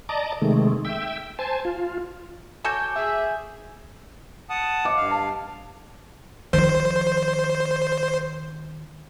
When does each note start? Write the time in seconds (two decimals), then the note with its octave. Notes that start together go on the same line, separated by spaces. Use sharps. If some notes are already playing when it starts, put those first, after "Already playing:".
0.09 D5 D#5 A5 A#5
0.41 C3 D#3 G#3 A3
0.85 E5 G5
1.39 C5 G#5 A5
1.65 F4
2.64 F#4 A4 C#5 G#5 D6 G6
2.96 G#4 E5
4.50 F#5 A5 D#6
4.85 D#5 D6
4.97 G2 F5
5.10 A5
6.53 D#3 F3 C5